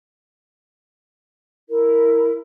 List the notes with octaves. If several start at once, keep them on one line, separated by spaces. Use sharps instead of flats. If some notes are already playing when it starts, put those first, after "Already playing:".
E4 A#4